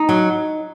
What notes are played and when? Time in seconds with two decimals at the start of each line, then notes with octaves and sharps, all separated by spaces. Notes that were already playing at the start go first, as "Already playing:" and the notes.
Already playing: D#4
0.09 F#3